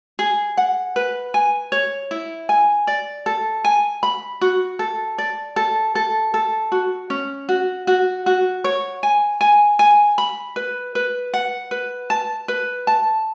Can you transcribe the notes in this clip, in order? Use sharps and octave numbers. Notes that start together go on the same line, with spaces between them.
G#4
F#5
B4
G#5
C#5
E4
G#5
D5
A4
G#5
B5
F#4
A4
D5
A4
A4
A4
F#4
C#4
F#4
F#4
F#4
C#5
G#5
G#5
G#5
B5
B4
B4
F#5
B4
A5
B4
A5